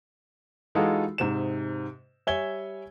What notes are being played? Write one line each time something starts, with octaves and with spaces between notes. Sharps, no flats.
E3 G#3 D#4 F4 F#4 A4
G#2 C3 E7
G3 C#5 E5 G#5 G#6 G7